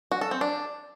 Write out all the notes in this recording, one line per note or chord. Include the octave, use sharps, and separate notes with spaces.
F#4
A4
C4
D4